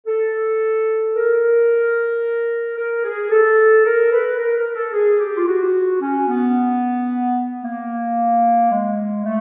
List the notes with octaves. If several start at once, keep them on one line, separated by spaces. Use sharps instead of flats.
A4
A#4
A#4
G#4
A4
A#4
B4
A#4
A#4
A4
G#4
G4
F4
F#4
C#4
B3
A#3
G#3
A3